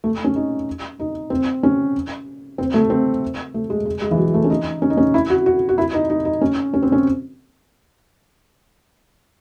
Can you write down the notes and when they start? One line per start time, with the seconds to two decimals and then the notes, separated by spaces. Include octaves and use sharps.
0.04 A3
0.24 C#4
0.36 D#4
1.00 D#4
1.30 C4
1.63 C#4
2.58 C4
2.74 A3
2.90 C4
3.54 A3
3.70 G#3
3.86 G#3
4.01 G#3
4.11 E3
4.18 F#3
4.34 A3
4.44 C#4
4.50 D#4
4.82 C#4
4.90 D#4
4.97 C#4
5.14 E4
5.30 F#4
5.46 F#4
5.69 F#4
5.78 E4
5.94 D#4
6.10 D#4
6.25 D#4
6.41 C#4
6.74 C#4
6.82 C4
6.92 C#4